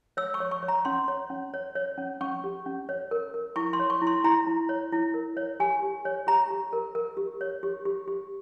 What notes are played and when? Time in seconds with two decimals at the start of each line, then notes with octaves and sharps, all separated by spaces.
0.17 C#5 E6
0.34 C#6
0.40 C#5
0.51 C#6
0.63 C#5
0.68 A#5
0.85 C#4 C6
1.08 C#5
1.30 C#4
1.54 C#5
1.75 C#5
1.98 C#4
2.21 C#4 C#6
2.44 G4
2.66 C#4
2.89 C#5
3.11 A#4
3.34 A#4
3.56 E4 C#6
3.73 C6
3.80 C#5
3.90 C#6
4.02 E4
4.07 C6
4.24 E4 A#5
4.47 E4
4.69 C#5
4.92 E4
5.14 A#4
5.37 C#5
5.60 G4 G#5
5.83 G4
6.05 C#5
6.27 G4 A#5
6.50 G4
6.73 A#4
6.95 A#4
7.17 G4
7.41 C#5
7.63 G4
7.85 G4
8.08 G4